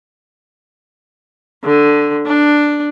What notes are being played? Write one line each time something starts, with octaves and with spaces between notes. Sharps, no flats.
D3
D4